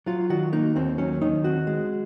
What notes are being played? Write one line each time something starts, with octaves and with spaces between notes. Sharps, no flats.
F#3 F4
D#3 F#4
A#3 D#4
D#2 C4
F#3 C#4
D#3 D#4
C4 F#4
G#3